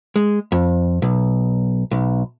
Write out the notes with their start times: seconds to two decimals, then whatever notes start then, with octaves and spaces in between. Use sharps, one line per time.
0.16 G#3
0.52 F2
1.02 B1
1.91 B1